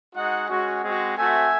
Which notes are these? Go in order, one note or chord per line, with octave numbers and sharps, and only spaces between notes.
G#3 D#4 F#4 D#5 F#5
G#3 C#4 F#4
G#3 C4 F#4
A3 C4 F#4 E5 G#5